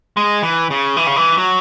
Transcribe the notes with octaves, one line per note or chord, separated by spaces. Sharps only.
G#3
E3
C#3
E3
C#3
E3
F#3